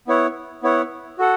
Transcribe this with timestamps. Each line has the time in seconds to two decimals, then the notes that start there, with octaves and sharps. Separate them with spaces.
0.08 B3 E4 C#5 F#5
0.63 B3 E4 C#5 F#5
1.18 F#4 A4 F#5